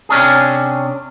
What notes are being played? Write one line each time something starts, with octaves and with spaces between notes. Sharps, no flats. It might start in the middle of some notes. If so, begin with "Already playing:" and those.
C3 C#4 D4 G#4